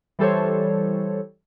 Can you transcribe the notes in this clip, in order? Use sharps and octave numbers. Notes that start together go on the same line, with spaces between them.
E3 G3 A4 C5 C#5